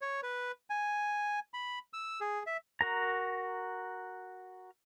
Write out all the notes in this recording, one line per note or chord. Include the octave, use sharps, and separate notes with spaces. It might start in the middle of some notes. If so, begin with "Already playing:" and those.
C#5
B4
G#5
B5
E6
G#4
E5
F#4 A#4 A#5